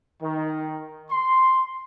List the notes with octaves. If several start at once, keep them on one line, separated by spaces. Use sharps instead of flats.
D#3
C6